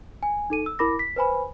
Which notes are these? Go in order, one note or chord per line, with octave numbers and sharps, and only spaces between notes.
G#5
D#4 A4 D#7
E6
E4 A#4 B5 D6 A#6
B6
B4 C5 G#5 B5